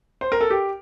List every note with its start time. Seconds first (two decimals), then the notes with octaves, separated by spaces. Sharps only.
0.21 C5
0.32 A#4
0.41 A4
0.50 G4